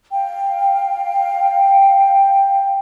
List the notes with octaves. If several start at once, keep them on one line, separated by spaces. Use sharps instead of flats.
F5 G5